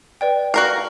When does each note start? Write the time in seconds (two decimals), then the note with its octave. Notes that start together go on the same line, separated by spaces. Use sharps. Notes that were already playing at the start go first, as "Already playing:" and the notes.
0.21 B4 D5 G5
0.54 F#4 A#4 F5